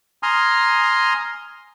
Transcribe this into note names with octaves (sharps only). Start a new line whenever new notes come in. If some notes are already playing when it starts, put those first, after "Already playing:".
G#5 A#5 C6 D#6 F6